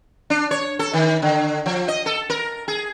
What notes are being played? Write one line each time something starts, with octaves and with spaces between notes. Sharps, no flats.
D4
C#5
A4
D#3
D3
F3
D#5
A4
A#4
G#4